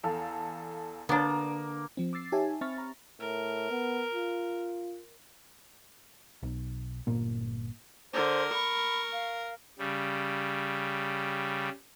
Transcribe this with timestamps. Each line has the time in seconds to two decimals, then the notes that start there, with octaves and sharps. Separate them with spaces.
0.04 E2 A4 F5
1.09 D3 A#3 B3 D4 A#5 D6
1.97 F3 C4
2.13 D6 E6 A6 C7
2.32 D#4 G4 C#5 E5 G#5 A5
2.61 C4 E5 B5 C#6 F6 A6
2.78 A#5
3.20 A2 A#4
3.70 B3
4.14 F4
6.43 B1
7.07 G1 A#2 A#3
8.13 D3 A#4 C5
8.54 B5 C#6
9.13 F5
9.79 C#3 G3